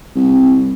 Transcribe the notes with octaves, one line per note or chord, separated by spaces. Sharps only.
C2